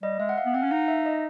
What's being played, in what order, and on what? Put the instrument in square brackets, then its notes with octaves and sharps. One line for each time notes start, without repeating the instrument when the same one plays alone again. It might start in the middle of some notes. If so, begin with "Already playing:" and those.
[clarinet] G3 [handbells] D#5
[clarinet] G#3 [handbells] E5
[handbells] F#5
F5
[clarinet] B3
[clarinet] C4 [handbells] F#5
[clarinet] C#4
[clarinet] D#4 [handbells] F5
[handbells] E5
D#5